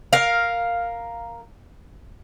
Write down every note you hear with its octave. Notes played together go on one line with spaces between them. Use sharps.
A#4 F5